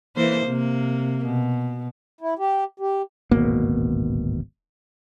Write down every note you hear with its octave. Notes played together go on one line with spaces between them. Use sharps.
E3 A#3 C5
C3 A#3
B2
E4
G4
G4
D1 G#1 B2 A#3